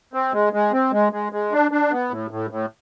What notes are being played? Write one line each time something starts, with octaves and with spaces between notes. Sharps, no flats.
C4
G#3
G#3
C4
G#3
G#3
G#3
D4
D4
B3
A2
A2
A2